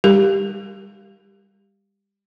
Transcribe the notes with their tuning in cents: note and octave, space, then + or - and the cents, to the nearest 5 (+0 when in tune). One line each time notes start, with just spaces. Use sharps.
G3 +30 G4 +0 A#4 -30